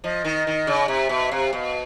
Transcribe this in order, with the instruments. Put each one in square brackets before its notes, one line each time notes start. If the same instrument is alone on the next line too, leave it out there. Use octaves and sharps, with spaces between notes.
[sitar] F3 [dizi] D#5
[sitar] D#3
D#3
C#3
[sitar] C3 [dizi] E5
[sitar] B2
[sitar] C3 [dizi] F5
[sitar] B2